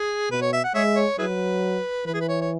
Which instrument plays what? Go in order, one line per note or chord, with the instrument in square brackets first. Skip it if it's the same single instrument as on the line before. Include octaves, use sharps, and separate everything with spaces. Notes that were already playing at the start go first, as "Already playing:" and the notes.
Already playing: [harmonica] G#4
[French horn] B2 [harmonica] B4
[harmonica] C#5
E5
F#5
[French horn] G#3 [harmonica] G#4 C#5 E5
[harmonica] C#5
[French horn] F#3 [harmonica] E4 G#4 B4
[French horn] E3 [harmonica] B4
[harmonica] G#4
B4
C#5
C#5